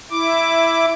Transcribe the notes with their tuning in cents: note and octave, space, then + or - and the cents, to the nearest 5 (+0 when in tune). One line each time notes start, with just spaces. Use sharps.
E4 +0 D6 +0